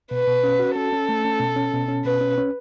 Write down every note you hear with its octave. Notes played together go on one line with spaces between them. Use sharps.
B2 B4
B2
C#4
F#4
C#4 A4
C#4
A3
C#4
B2
C#4
B2
C#4
B2 B4
C#4
C#4